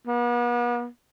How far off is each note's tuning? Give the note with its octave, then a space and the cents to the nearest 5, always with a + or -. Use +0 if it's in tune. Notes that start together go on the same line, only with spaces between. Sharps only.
B3 -40